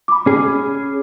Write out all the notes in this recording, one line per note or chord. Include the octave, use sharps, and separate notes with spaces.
B5 D6
C#4 G#4